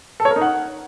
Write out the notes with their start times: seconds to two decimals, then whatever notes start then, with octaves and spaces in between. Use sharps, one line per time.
0.20 A4
0.25 C#5
0.31 A#4
0.36 D#4
0.42 F#5